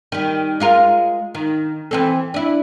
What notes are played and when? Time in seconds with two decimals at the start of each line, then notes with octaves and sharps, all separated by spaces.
0.12 D#3 G3
0.60 G#3 F4 A#4
1.35 D#3
1.91 E3 C4 A4
2.34 D4 E4